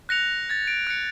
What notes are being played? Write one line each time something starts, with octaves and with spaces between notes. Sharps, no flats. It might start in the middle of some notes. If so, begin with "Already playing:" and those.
F#6 A#6 C#7 F7
G#6 A6
D7
F#6 C#7